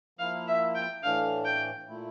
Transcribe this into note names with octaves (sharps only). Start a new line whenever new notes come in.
F3 A#3 E4 F5
E5
G5
A2 E3 A3 D4 F5
G5
A#2 A3 E4